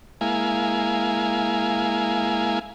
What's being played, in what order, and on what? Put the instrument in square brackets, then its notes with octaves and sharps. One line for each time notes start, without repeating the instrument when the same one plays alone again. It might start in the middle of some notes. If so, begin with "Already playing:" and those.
[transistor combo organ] G#3 A#3 E4 F5 G#5